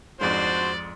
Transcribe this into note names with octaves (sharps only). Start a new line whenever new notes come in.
F2 G#2 D4 F#4 C5 D5